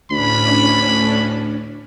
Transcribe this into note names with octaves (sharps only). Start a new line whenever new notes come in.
D2 A2 C#4 D4 B5